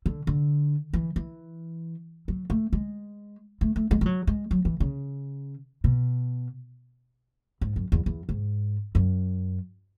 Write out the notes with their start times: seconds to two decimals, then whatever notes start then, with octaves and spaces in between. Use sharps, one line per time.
0.06 D3
0.27 D3
0.93 E3
1.16 E3
2.28 F#3
2.50 A3
2.73 G#3
3.61 A3
3.76 A3
3.91 G#3
4.01 G#3
4.06 F#3
4.27 G#3
4.51 F#3
4.65 E3
4.80 C#3
5.84 B2
7.61 G#2
7.76 F#2
7.92 E2
8.06 E2
8.29 G#2
8.95 F#2